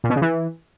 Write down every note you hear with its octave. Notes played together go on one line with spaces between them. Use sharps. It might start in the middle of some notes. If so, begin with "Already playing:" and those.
A#2
B2
C#3
E3